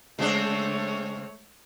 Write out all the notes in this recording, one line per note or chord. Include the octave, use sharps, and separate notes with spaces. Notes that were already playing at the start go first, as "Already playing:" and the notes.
C#3 G#3 A3 C4 D4 C#5